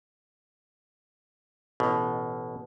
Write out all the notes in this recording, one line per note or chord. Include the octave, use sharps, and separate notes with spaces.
A1 B2